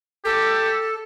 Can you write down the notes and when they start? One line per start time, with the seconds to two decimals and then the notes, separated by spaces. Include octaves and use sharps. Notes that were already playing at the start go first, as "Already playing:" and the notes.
0.25 G4 A4